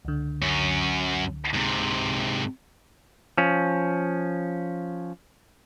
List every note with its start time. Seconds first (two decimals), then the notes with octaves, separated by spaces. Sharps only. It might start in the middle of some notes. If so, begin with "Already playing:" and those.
0.05 C#2 D3
0.42 F#2 C#4
1.54 G#2 C3
3.38 F3 C#4